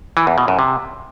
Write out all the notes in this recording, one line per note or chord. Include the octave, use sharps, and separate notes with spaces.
E3
E2
B2
F#2
C3